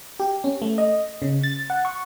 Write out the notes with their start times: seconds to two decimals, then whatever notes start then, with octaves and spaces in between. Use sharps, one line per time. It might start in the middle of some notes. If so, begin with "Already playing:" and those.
0.20 G4
0.44 C#4
0.62 A3
0.78 D#5
1.22 C#3
1.44 A6
1.70 F#5
1.85 C#6